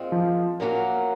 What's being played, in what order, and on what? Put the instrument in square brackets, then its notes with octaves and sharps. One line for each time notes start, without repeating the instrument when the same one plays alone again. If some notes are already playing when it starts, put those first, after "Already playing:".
Already playing: [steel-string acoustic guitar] A#2 G#3 C4 F4
[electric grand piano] F3
[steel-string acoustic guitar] A#2 F#3 A#3 C#4 F#4